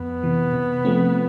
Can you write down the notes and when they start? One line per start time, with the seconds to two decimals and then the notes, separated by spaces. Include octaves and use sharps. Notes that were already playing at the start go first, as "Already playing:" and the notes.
Already playing: F2 B3
0.23 C3 E3
0.53 C3
0.85 F3 A3 C4